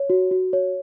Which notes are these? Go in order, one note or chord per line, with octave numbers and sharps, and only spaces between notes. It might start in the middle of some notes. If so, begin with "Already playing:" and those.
Already playing: C#5
F#4
F#4
C#5